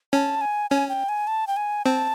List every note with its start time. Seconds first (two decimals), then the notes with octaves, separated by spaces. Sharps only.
0.13 C#4 A5
0.41 G#5
0.70 C#4 G#5
0.89 G5
1.09 G#5
1.27 A5
1.47 G5
1.57 G#5
1.85 C4 A5